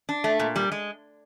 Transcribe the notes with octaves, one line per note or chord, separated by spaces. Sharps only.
D4
A3
A#2
G3
G#3